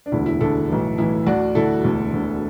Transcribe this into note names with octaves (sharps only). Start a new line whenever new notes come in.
D4
E1 D2 D3 E4
E4
E1 D2 D3 E4 A4
B1 A2 E3
B1 A2 E3 E4
D2 D3 D4 F#4
D2 D3 E4 A4
E1 D2 D3
E1 D2 D3